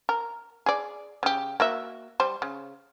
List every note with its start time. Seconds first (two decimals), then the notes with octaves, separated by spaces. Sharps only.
0.09 A#4
0.66 G#4 D5
1.23 C#3 G4
1.60 A#3 F#4 E5
2.20 G3 C5
2.42 C#3